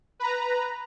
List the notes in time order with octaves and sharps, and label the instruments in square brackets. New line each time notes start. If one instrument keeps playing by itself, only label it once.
[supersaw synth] B4 A#5